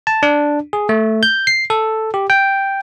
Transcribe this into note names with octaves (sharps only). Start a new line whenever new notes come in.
A5
D4
G#4
A3
G6
C7
A4
G4
G5